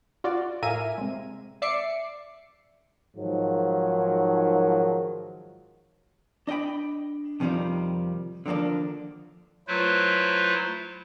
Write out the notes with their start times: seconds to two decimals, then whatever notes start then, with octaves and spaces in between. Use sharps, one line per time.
0.24 F4 F#4 D5
0.62 A2 A#4 E5 F5 G#5 D#7
0.98 C3 G#3
1.62 D5 E5 D6 C7 C#7
3.15 G#2 D#3 F3 F#3
6.47 D4 D#5 F5 G5 B5
7.40 F2 C3 D#3 F3 G3 D#4
8.46 D3 D#3 F3 A#3 D4
9.68 F#3 A3 E4 F4 B4 C5